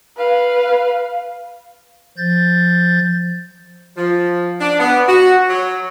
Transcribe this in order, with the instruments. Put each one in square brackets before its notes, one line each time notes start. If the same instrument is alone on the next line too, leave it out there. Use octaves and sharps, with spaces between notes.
[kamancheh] B4 F5
[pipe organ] F3 G6 A6
[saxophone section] F3
D4
B3
F#4
F#3